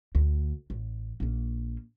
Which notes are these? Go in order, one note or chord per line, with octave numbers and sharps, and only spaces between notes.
D2
A1
A#1 A#3